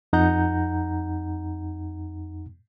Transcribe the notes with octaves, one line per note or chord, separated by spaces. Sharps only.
F2 D#4 F#5 A#5 G6